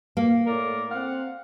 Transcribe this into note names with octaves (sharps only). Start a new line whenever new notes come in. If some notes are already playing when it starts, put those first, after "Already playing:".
A#3
A2 A#4 D5
C4 F5 F#5